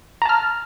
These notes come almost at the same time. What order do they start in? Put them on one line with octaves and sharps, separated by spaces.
A#5 A5 F6